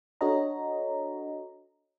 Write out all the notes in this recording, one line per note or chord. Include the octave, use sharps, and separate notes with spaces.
D4 F#4 A4 C#5 D#5 A#5